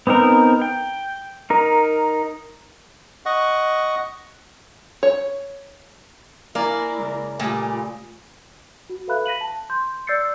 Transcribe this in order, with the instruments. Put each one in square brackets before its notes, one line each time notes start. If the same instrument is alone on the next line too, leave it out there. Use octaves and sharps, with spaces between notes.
[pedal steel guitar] B3 C4 D#4 A#4
G5
D#4 A#4
[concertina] D#5 F#5 C#6
[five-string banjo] C#5
[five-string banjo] A#3 [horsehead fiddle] E4 A#4 [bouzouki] D5 [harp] F5 G#5
[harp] C#3 G#3
[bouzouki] A#2 G3 [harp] A3 G#5 D#6 [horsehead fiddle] F4 G4
[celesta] F#4
A4 B4 E5 F5 B5 F#6
A#6 B6 D#7 F#7
A5
C6 G6
D5 E6 G6 A6 C7 C#7